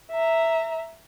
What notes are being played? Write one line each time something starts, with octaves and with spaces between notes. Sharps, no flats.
E5 A#5